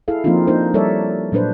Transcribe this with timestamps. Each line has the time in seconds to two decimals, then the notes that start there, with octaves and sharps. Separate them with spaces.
0.08 E4 G#4 A4 F5
0.24 F3 A#3 C4 D4 D#4 F4
0.47 A#3 D4 D#4 A#4 C5
0.74 G3 A4 A#4 C#5 D5 E5
1.32 A#2 F#3 D4 B4 C5